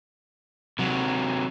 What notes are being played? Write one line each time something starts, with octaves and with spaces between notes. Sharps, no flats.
C3 F#3